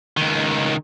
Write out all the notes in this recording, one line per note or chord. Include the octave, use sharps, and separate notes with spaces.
C#2 D#3